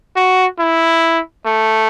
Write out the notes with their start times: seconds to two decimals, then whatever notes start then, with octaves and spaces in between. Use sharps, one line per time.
0.16 F#4
0.59 E4
1.46 A3